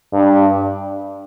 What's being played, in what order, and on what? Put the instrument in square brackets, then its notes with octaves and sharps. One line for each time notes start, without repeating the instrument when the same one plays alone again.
[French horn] G2